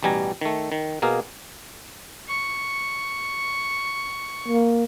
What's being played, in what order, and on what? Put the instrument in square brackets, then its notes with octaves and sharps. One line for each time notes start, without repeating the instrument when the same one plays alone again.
[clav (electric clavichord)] A1 B2 G3 G#5 A#5
D#3 A3
D#3
B2 A#3 G#4 A#4 F5
[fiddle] C#6
[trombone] A#3